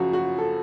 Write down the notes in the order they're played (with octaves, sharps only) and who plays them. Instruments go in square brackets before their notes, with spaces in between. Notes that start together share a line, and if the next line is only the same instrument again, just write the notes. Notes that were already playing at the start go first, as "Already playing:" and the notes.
Already playing: [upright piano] F#2 C#3 F3 F#4
F#4
A4